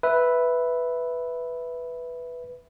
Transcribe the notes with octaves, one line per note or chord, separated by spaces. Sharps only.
B4 E5